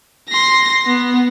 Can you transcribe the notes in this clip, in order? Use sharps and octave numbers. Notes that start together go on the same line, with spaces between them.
C6 A#6
B3